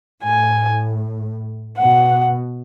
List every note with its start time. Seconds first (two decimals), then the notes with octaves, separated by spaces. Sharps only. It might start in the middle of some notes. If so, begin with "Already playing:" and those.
0.24 A2 G#5
1.78 B2 F#5